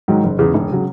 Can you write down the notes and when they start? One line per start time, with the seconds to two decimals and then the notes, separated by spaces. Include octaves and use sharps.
0.08 G#2 D#3 F#3
0.23 F#1
0.39 E2 C#3
0.54 E1
0.72 C#3 F#3